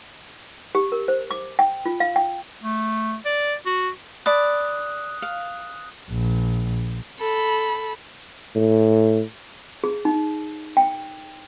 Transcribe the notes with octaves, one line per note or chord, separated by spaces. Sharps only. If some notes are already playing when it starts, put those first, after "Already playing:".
G4
A#4
C5
D6
G5
F4
F5
G5
A3
D5
F#4
D5 A5 B5 D#6 F#6
F5
A#1
A4 B5
A2
G#4
D#4
G5